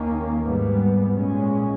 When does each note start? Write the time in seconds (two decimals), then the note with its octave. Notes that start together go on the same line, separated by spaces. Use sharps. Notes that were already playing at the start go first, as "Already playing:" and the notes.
Already playing: D#2 D#3 A#3 C#4
0.43 G#2 G3 B3
1.16 A#2 G#3 C#4